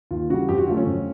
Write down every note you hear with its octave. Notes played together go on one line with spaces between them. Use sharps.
D#2 F4
C#3 E3 G3 F#4
F2 G4
F#4
D3 F#3 A3 F4
C#4
F2